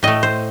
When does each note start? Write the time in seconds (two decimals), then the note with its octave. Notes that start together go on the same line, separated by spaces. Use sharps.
0.03 A2 A3 D#5
0.23 C5